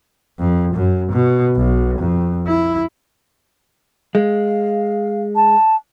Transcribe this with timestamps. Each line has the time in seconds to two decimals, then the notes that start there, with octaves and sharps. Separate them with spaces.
0.39 F2
0.75 F#2
1.12 B2
1.56 B1
1.99 F2
2.48 E4
4.15 G#3 F5
5.36 A5